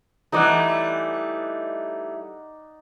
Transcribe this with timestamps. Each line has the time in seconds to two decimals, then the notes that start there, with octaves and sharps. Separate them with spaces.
0.32 E3 G3 A3 D#4 D5 F#5